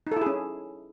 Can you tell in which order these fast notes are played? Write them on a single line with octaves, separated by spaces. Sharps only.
D#4 A4 E4 G#4 C#4